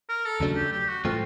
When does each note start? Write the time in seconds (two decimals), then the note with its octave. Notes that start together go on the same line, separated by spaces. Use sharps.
0.09 A#4
0.26 A4
0.40 D#2 C#3 F#3 A3 D4
0.56 G4
0.72 G4
0.88 F#4
1.04 A2 F3 A3 C4 F4